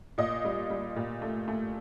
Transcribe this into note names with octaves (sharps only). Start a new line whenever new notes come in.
A#2 D#5
G3
G3
A#2
A3
A3